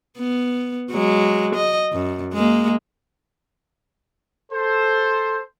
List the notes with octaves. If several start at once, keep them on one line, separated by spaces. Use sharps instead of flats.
B3
F#3 G#3
D#5
F#2
G#3 A#3
A4 C5